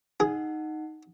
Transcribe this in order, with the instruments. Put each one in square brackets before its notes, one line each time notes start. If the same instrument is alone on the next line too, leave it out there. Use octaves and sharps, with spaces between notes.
[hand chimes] D#4 F#5 [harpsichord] G#4